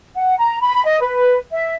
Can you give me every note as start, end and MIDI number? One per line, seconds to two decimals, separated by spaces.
0.16 0.36 78
0.38 0.60 82
0.61 0.82 83
0.84 0.98 75
0.99 1.38 71
1.51 1.73 76